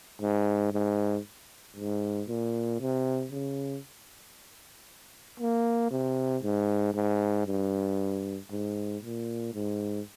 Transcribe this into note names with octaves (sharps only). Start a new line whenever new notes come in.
G#2
G#2
G#2
A#2
C3
C#3
A#3
C3
G#2
G#2
G2
G#2
A#2
G#2